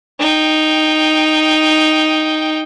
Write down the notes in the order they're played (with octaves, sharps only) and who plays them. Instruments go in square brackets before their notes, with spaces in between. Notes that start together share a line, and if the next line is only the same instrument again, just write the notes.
[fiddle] D#4 G5